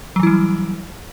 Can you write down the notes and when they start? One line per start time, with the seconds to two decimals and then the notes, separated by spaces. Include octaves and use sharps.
0.16 F#3
0.20 E3
0.23 E4
0.27 G3